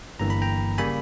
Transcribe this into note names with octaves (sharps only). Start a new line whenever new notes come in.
G1 G2 E3 A#3 A#5
B5
G5 A#5
C#3 G3 A#3 G#5 B5